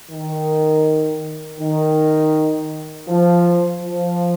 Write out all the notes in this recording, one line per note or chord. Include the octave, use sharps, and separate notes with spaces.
D#3
D#3
F3
F3